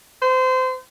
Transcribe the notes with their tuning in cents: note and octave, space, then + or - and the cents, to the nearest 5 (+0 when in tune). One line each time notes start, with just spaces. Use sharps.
C5 -25